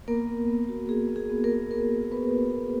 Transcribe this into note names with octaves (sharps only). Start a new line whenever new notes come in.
A#3 B3 A#4
B3
B3
F#4
F#4 G#4
B3
G#4
B3
A#3 A#4
F#4
A#3 B3 A#4
F#4
B3 F#4 B4
F#4
F#4